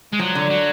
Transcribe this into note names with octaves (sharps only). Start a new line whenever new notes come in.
G#3
F3 F#3
D3
F#3